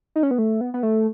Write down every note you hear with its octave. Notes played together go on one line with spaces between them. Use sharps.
D#4
C#4
B3
A3
B3
B3
A3